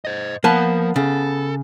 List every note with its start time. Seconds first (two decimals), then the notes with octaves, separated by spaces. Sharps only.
0.05 C5 D#5
0.44 F3 A#3 B3 A5
0.96 C#3 A4